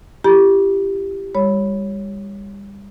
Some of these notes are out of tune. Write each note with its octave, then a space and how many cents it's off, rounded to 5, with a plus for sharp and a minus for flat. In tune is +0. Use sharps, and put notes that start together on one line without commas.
E4 +40 G4 +0 B5 -40
G3 +35 C#5 +0 B5 +0